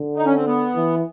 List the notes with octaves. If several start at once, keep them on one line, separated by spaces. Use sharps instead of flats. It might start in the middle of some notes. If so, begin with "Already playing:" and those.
Already playing: D3
D#4
C#4
C4
B3
E3